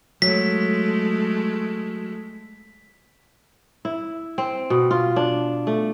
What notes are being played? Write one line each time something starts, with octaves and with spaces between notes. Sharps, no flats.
F#3 G#3 A3 B6
E4
C4
B2
F4
D4
A3